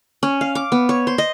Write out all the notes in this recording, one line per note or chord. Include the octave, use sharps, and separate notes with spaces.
C#4
F5
D6
B3
C#5
C5
D#5